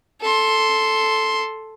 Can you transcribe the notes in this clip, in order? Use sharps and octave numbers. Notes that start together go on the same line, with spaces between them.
A4 C6